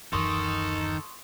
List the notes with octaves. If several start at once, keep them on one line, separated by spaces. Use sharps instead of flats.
D1 F#2 D#3 E3 A4 C6 C#6 D#6